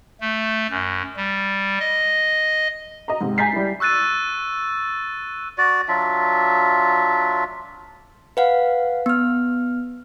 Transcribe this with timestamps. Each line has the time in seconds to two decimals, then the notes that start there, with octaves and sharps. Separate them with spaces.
0.20 A3
0.70 F#2
1.17 G3
1.80 D#5
3.08 D#5 A#5
3.21 G#2 C3
3.38 G#5 A#5 G6 A6 B6 C7
3.53 G3 E4
3.80 C#6 E6 F#6 A6 D#7
5.58 F#4 D5
5.88 F#3 D4 F4 E5
8.37 B4 F5 F#5
9.06 B3 F6